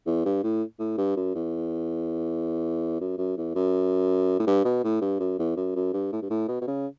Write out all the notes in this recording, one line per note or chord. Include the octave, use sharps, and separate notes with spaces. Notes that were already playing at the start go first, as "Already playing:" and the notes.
E2
G2
A2
A2
G2
F#2
E2
F#2
F#2
E2
F#2
A2
G2
B2
A2
G2
F#2
E2
F#2
F#2
G2
A2
G2
A2
B2
B2
C#3